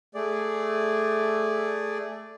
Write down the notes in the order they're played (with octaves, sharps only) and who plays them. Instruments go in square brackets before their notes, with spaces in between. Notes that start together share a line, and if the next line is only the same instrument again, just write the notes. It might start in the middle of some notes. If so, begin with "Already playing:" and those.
[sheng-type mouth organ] A3 G#4 D5